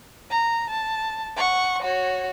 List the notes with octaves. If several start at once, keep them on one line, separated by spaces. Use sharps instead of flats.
A#5
A5
F#5 C#6
F#4 C#5